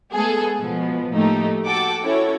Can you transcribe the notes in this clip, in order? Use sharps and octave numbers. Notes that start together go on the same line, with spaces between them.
G#3 A3 B3 G#4 A4
B2 F3 B3
A2 F3 A3 A#3 D#4 G4
F#4 A4 F#5 G5 A5 D6
C#4 E4 F#4 A4 C#5